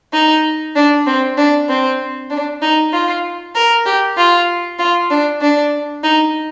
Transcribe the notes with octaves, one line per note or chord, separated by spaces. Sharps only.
D#4
D4
C4
D4
C4
D4
D#4
F4
A#4
G4
F4
F4
D4
D4
D#4